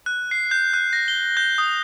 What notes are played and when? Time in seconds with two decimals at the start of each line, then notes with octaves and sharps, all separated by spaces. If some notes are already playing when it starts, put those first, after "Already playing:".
0.06 F#6
0.31 C7
0.51 G6
0.74 F#6
0.93 A#6
1.08 G7
1.37 G6
1.58 D#6